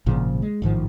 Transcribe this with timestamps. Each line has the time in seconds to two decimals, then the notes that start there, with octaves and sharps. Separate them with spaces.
0.06 G#1 A#2 C#3 F3
0.42 G#3
0.62 A1 G#2 D#3 F3